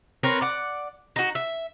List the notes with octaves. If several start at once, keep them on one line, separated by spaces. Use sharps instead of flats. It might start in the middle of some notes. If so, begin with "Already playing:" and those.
C4 A#4 B4 C#5
D5 F#5
D#4 F#4
E5